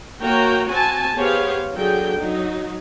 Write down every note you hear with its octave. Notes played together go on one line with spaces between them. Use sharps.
A#3 F#4 C#5 G5 A#5
C4 F#4 G#5 A5
B3 G4 G#4 C5 C#5 F5
D3 F#3 G#4 G5
F#3 D#4